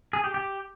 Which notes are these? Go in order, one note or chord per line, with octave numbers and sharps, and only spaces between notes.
G#4
G4
G4